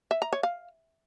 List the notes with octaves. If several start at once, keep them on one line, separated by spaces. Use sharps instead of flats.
E5
A#5
C#5
F5